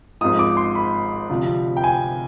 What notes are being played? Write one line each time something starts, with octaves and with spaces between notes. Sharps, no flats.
G#1 G#2 F3 D#6
D6
C6
B5
D2 C3 F3
G5
G#5